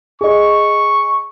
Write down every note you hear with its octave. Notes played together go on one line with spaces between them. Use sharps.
G#4 D#5 C#6